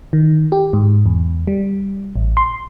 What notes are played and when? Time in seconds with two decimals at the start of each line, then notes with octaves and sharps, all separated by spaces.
0.13 D#3
0.52 G4
0.73 G#2
1.06 E2
1.47 G3
2.16 A1
2.37 C6